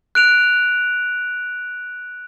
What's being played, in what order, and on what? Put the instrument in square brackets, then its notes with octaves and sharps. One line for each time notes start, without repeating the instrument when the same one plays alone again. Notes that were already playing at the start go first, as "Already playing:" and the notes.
[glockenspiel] F#6 D7 F7